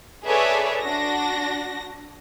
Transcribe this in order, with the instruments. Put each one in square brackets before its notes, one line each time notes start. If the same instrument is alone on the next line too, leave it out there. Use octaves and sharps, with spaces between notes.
[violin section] G#4 A4 B4 C#5 D5 E5
D4 F#4 A#6